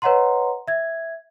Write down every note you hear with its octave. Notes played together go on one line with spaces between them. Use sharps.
B4 C#5 D#5 F#5 A#5 C6
E5 G#6